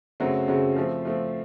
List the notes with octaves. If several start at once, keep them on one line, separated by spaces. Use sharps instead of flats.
F#2 C#3 F#3 A3 C4
F#2 C#3 F#3 A3 C4
F3 A3 C4
F3 A3 C4